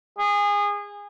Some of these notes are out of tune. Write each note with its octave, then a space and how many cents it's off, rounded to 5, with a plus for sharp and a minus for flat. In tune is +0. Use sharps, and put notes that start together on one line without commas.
G#4 -25